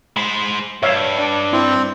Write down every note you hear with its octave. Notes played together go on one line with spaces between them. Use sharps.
G#3 C5 B5
G2 C#5 E5 F5
D4
C4 E4